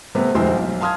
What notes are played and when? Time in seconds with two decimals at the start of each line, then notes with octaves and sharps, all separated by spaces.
0.15 C3 G3 A3 B3
0.35 F1 D2 B2 G#3 E4 C5
0.51 B1
0.80 F5 A5 C6 D#6 F6 G#6